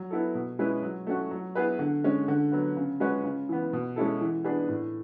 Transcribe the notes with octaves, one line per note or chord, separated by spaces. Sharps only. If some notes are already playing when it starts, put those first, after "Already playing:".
Already playing: F#3
B3 E4 A4
B2
G#3 C#4 E4 B4
F#3
A3 C#4 F#4
F#3
B3 E4 G#4 B4
D3
G#3 C#4
D3
F#3 B3
C#3
G#3 C#4 F#4 B4
C#3
E3 B3
B2
G#3 C#4 E4 A4
E3
B3 D4 G#4 B4
A2